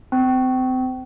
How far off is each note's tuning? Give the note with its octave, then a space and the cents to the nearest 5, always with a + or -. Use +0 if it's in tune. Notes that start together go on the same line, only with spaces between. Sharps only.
C4 -30